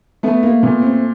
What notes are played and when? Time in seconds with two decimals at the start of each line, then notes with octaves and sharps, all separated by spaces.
0.23 A3 B3
0.43 A#3
0.63 A#2 B3
0.82 C4